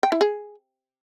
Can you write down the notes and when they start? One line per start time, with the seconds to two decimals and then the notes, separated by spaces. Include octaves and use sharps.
0.03 G5
0.12 E4
0.21 G#4